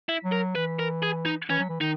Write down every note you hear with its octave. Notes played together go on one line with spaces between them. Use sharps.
E4
F#3
A#4
E3 B4
A#4
G#4
D#4
E3 C#4
F#3
E3
D#3 D#4